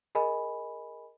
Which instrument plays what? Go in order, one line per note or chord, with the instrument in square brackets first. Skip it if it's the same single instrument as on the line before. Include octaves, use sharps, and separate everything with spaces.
[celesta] G#4 A#4 D#5 G#5 B5